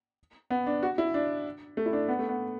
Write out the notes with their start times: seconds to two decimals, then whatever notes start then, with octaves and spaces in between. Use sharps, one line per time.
0.50 B3
0.67 D4
0.83 F#4
0.98 E4
1.14 D4
1.77 A3
1.86 E4
1.93 D4
2.08 B3
2.19 A3
2.29 B3